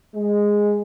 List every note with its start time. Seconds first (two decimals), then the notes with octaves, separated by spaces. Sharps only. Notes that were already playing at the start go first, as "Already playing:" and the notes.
0.15 G#3